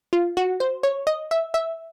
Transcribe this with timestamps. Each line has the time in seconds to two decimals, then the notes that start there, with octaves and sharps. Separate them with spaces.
0.13 F4
0.37 F#4
0.60 C5
0.83 C#5
1.07 D#5
1.31 E5
1.54 E5